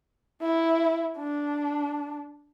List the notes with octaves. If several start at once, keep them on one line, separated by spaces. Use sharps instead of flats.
E4
D4